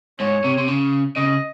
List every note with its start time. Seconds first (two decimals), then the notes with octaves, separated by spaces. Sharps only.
0.20 G#2 C#5
0.44 C3
0.58 C3
0.68 C#3
1.17 C#3 D#5